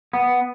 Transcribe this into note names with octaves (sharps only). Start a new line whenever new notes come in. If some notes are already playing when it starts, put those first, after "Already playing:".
B3